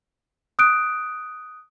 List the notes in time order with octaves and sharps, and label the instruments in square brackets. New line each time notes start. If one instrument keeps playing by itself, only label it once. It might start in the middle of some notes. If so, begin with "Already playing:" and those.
[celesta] D#6 F#6 D7